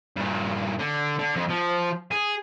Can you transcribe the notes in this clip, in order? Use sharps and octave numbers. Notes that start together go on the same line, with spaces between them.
G2 A#2
D3
D3
F2
F3
G#4